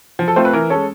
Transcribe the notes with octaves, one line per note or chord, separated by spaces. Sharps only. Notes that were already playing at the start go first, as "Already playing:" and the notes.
F3
A4
A3 C4 F4 C5
B4
E3 A#4
G#3 C#4 A4